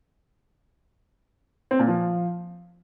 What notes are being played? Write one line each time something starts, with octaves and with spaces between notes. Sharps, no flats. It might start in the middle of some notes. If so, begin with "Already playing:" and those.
C4
A#2
F3